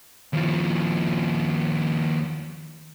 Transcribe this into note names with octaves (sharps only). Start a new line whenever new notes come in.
D#2 F3